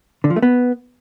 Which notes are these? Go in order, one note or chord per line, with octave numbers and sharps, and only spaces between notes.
D3
F3
A3
B3